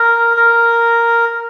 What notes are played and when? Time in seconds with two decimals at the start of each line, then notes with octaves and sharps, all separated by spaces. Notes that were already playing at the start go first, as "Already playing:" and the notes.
Already playing: A#4
0.37 A#4